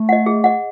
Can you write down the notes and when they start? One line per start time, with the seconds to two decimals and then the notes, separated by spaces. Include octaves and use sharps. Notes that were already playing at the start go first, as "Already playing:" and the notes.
Already playing: A3
0.09 D#5 F#5
0.26 G#4
0.44 D#5 F#5